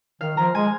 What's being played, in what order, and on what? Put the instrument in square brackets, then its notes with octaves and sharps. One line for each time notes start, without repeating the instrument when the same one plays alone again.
[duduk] D#3 [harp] F5
[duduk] F3 [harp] A#5
[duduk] G#3 [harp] G#5